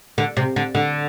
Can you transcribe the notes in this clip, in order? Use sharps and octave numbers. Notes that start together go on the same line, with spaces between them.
D3
C3
D3
D3